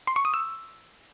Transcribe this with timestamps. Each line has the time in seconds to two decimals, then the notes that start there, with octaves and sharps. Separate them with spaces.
0.07 C6
0.16 C#6
0.25 D#6
0.34 E6